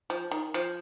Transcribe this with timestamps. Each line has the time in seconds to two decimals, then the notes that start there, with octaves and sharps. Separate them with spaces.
0.10 F3
0.31 D#3
0.54 F3